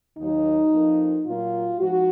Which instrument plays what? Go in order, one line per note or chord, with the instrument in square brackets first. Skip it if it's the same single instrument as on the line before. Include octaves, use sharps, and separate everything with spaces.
[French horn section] D#2 D#3 F#3 D#4
F2 F3 A#3
A#2 F#3 A#3 F4
G#2 F3 F#4